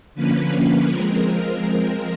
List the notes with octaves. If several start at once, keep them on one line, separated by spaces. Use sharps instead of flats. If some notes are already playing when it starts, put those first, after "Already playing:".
D3 F3 A#3 C#4 B4
F3 G#3 C4 A#4